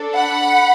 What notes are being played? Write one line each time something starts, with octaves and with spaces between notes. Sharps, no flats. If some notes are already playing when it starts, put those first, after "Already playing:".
Already playing: D4 A4
F#5 B5